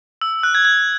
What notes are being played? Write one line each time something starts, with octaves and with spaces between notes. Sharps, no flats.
E6
F#6
G#6
G#6